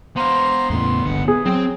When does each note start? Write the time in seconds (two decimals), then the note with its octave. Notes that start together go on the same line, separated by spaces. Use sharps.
0.16 B3 C5 F5 A#5 C6
0.70 E2 A2 C#3 C6
1.05 D1 G1 D3 G#3 F#5
1.28 E3 B3 G#4
1.46 F#3 C4 G5